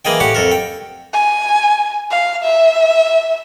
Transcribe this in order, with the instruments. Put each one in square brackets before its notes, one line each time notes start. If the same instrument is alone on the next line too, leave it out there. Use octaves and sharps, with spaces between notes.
[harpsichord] E3 A#3 G#4 D#5 G5
A2 G4 F#5 D6
F2 A4 A#4
G5
[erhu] G#5
F5
E5